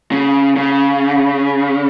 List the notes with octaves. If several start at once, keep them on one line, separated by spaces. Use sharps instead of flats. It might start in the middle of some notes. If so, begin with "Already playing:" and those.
C#3
C#3